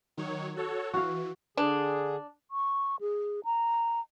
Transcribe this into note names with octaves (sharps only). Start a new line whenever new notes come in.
D#3 F#3 C#5
F#4 A4 C#5
E3 F#4 F5
D3 D4 G#4
C#6
G#4
A#5